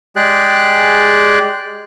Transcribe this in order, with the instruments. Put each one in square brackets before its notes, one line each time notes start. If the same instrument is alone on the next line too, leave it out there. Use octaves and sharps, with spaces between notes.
[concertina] G#3 G4 G#4 D5 F#6